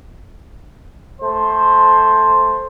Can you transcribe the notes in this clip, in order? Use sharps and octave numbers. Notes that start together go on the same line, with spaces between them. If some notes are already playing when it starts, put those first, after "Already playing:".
A3 C5